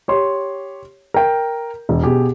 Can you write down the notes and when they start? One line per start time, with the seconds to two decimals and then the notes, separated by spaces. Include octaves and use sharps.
0.08 G4 C#5 C6
1.14 A#4 G5
1.89 E1
2.02 B2 G4 G#4